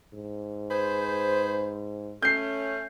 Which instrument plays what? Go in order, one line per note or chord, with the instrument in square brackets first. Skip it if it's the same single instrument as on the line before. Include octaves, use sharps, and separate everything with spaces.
[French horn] G#2
[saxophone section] G#4 B4 C5
[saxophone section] A3 C#4 [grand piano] G6 C7